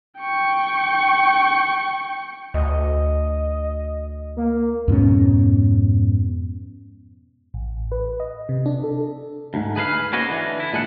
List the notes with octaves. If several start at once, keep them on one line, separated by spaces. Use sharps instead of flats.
G5 C#6
D2 D#5
A#3
F2 G#2 B2 C#4
A1
B4
D#5
C3
D4
A4
D2 G#2
G#4 B4 E5 F5
A#3 C#4 F#4 B4 C#5 D#5
D3 E3
E4
A#2 G#3 G#4 A4 F#5